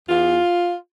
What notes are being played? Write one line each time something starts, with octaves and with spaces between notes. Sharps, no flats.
E2 F4